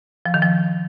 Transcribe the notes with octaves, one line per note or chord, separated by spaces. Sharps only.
F3
D#3
F3